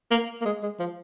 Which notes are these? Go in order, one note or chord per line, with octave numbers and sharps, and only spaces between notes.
A#3
A#3
G#3
G#3
F3